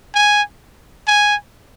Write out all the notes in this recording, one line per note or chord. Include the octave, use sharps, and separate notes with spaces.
G#5
G#5